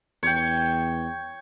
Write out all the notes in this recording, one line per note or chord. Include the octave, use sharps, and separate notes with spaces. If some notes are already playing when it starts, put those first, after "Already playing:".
E2 C#5 G5